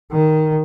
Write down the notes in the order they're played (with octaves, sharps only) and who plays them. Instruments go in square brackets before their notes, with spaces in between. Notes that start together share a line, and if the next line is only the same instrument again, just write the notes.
[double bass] D#3